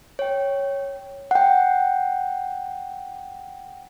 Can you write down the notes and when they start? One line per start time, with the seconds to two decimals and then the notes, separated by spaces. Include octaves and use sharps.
0.19 C#5 G5
1.31 F#5 G5